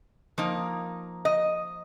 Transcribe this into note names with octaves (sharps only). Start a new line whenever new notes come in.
F3 A#3 D#4
D#5